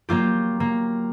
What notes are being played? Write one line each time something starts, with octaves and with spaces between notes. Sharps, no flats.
F#3 A#3 F4 G4
A#3